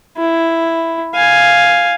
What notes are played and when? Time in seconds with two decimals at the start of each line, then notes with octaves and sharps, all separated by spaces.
0.17 E4
1.14 F5 G#5